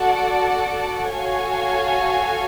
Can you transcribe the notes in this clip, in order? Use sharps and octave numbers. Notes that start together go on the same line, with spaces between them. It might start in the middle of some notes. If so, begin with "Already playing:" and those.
Already playing: F#4 A4 D5 F#5 A5
F#4 A4 C#5 F5 G#5